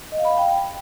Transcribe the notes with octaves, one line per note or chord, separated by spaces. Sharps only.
D#5
F5
B5
F5
G5